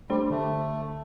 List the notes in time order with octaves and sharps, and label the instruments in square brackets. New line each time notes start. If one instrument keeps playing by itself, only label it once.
[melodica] G3 [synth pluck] A3 D4 G4 C5
[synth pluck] D3 [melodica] A3